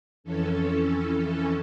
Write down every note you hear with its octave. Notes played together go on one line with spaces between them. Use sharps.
F2 E3 C#4 A4